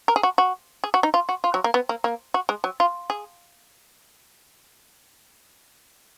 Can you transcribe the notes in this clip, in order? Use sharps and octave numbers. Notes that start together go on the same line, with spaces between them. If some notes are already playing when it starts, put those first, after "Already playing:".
A#4
G#4
F#4
F#4
G#4
F#4
D#4
F4
F#4
F4
F#3
A#3
B3
A#3
A#3
F#4
G#3
F#3
F4
G#4